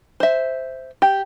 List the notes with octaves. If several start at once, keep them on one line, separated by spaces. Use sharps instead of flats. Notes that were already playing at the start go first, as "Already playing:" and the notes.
C5 E5
G4